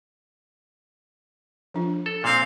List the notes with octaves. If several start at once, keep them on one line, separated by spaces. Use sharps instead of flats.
F3 D4 F4
A4
A#2 C4 F5